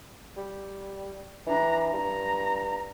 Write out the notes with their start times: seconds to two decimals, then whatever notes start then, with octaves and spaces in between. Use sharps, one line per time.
0.37 G3
1.47 E3 D4 A#5
1.93 G2 A#5